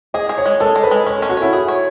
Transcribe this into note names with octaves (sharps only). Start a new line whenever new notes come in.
G#4 D#5
G#4
C#5
G#3
G#3 A4
G#3
B4
G#3
C#4 C#5
C#4 A4
F#4
E4 C#5
F#4 G#4
C#5